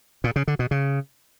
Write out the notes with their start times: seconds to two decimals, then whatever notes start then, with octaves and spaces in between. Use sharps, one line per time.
0.24 A#2
0.36 C#3
0.48 D3
0.59 B2
0.71 C#3